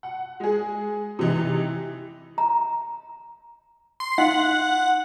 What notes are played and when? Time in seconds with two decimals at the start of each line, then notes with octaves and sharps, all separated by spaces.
0.03 F#5
0.40 G#3 G#4
1.19 C3 E3 D#4
2.38 A#5
4.00 C6
4.18 D#4 F5 F#5